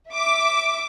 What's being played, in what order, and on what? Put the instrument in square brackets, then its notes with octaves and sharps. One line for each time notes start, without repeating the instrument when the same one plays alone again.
[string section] E5 D6